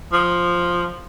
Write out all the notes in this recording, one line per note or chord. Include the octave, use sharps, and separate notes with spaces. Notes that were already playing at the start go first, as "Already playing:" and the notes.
F3